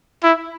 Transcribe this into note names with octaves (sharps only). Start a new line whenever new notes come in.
E4